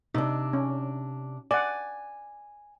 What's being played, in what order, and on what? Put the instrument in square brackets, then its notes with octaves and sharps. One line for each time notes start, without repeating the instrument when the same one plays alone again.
[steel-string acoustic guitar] C3 D4 [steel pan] D#4
[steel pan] C#4
[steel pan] D5 F#5 [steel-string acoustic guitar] G#5